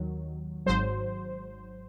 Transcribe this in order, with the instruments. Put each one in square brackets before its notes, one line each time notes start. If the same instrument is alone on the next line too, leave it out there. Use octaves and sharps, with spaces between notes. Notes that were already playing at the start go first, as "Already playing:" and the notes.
Already playing: [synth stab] D#2 D#3 F#3
G#1 G#2 F#3 C5